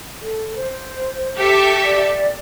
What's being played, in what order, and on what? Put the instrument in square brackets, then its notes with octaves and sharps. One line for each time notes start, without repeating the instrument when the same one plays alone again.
[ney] A4
C5
[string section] G4 A4 E5
[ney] D5